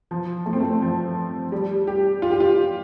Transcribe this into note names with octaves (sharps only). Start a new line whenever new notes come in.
F3
A3
C4
A3
F3
G3
G4
F4
G4
F4